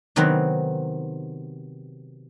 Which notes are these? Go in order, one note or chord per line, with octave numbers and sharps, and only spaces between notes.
C3 D#3 F#3 B3 C4